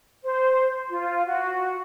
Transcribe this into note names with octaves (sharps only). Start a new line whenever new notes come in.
C5
F4
F#4